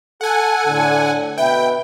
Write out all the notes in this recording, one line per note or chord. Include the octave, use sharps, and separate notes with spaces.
A4 F#5 G#5
A2 D3
B2 B4 E5 G5